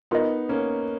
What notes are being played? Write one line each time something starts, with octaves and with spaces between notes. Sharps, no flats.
B3 D#4 F4 A#4 D#5
A#3 C#4